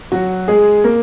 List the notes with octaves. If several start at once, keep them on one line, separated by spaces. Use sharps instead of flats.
F#3 F#4
G#3 G#4
A#3 A#4